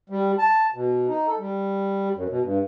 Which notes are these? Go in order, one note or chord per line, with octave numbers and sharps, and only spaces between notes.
G3
A5
B2
D#4
A4
G3
F#2
B2
G2